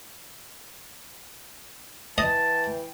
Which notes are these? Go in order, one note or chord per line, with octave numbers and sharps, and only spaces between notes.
E3 D#5 G5 A5